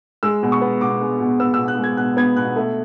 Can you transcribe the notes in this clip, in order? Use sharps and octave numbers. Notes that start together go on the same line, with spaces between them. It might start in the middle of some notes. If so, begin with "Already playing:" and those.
G#3 E6
B2
C#6
B3
B2 D6
G#3
B2
B3 E6
B2 E6
F#6
G#3
G#6
B2 F#6
B3 G#6
B2 F#6
A3